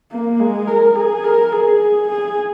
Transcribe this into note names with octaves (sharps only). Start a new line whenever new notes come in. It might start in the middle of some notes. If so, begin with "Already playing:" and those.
A#3
G#3
A#4
G#4
A#4
G#4
G#4